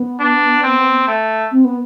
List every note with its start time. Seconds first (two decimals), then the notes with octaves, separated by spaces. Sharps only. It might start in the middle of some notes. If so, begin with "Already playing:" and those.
Already playing: B3
0.20 D4
0.63 C4
1.08 A3
1.52 C4
1.64 B3